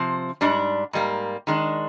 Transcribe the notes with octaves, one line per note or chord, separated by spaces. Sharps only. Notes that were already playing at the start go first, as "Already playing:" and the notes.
Already playing: C3 F3 C4
G#2 G3 D4
G#2 G3 A#3
D#3 G#3 D4